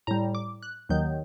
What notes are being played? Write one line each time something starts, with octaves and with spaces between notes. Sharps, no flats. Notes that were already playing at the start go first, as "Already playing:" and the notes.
A2 G3 A#5
D6
F#6
D#2 D#3 F#3 G6